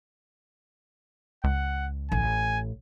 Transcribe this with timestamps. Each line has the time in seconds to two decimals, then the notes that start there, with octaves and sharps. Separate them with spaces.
1.44 C#2 F#5
2.12 A1 G#5